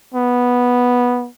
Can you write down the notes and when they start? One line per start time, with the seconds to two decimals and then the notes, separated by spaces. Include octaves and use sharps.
0.14 B3